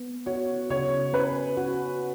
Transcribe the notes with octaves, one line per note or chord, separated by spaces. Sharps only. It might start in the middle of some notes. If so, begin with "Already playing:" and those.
Already playing: B3
F#4 C#5
C#3 C#5
C#4 B4
F#4